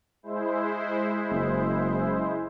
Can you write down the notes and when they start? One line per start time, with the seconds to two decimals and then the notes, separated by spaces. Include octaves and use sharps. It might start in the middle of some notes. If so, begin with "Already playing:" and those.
0.23 G#3 E4 C5
1.31 F#1